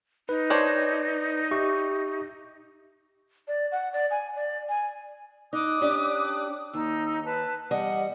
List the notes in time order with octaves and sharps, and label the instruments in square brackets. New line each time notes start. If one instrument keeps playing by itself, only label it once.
[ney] D#4 [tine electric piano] B4
[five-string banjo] D4 C5 C#5
[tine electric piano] G4 E5 C#6
[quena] D5
F#5
D5
G#5
D5
G#5
[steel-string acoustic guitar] D#4 [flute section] D6 D#6 F#6
[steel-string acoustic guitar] C#4 D4 G4
[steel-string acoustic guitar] D#2 [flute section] D#4 E6
[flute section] B4 A5
[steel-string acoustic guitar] E2 G3 D#5 [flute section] F#5